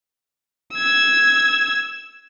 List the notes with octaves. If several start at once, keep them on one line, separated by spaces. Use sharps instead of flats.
E6 G#6